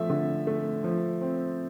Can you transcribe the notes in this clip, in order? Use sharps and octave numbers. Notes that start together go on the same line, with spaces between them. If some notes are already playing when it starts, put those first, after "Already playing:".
Already playing: F3 A3 E5
D3
A3
F3
C4